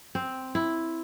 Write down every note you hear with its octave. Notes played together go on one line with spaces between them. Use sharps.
C4
E4